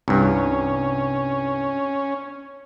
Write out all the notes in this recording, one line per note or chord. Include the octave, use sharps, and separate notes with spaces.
C2 G2 C#4